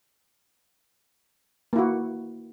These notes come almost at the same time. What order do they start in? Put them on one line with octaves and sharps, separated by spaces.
A#3 E4 F#4